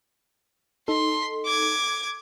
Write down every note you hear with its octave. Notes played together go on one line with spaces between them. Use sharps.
D#4 A4 C6 B6
D6 G#6